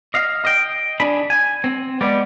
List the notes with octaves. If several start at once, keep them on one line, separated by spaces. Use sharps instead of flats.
D#5 F5
D#5 G5
D4 G#4 B5
G#5
C4
G3 G#3 B3 D5